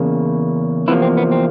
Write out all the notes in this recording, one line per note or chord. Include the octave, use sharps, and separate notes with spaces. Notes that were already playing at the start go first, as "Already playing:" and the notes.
Already playing: E2 C#3 A#3
E2 C3 E3 F3 A#3 E4
C4
B3
C4